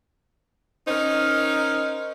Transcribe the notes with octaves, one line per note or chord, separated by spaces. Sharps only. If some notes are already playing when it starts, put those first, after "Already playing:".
C#4 D#4 A#4 C5